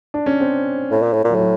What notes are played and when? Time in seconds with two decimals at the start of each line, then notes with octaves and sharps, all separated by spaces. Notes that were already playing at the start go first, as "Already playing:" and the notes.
0.14 D4
0.26 C#4
0.40 C4
0.91 A2
1.02 A#2
1.13 A2
1.24 A#2
1.30 F#3
1.35 A2
1.40 F#3